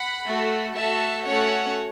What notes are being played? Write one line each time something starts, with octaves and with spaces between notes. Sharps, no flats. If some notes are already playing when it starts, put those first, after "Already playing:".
Already playing: F#5 B5
A3 F#4 A4
A3 F#4 A4 E5 A5
A3 C#4 F#4 A4 C#5 F#5